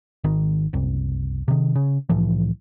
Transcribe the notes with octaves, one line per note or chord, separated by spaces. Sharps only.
G#1 D#3
F#1 C2
C3 D#3
C#3
C2 A2 E3 F3